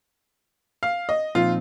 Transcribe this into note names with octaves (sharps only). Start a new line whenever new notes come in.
F5
D#5
A#2 F3 C4 D#4 F4